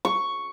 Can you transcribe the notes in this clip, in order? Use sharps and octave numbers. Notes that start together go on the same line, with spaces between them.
C#6